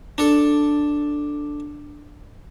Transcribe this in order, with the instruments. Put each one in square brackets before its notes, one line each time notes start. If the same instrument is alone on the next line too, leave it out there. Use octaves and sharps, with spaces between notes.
[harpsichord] D4 A4